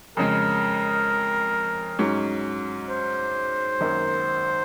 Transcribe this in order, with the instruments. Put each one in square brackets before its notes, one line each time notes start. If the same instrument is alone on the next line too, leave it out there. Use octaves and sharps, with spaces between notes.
[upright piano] F2 C#3 G#3 [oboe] A#4
[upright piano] G#2 F#3 C#4
[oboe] C5
[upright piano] G#1 F#2 D#3 A#3